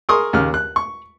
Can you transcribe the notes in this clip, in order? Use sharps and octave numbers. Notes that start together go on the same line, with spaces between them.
G#4 A#4 C6 C#6 D#6
D#2 C#3 F6
F#6
C#6